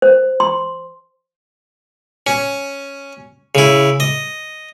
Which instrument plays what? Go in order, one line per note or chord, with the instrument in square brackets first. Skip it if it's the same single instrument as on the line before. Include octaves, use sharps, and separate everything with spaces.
[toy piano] C5
C6
[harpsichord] C#4
C#3 E4
D#5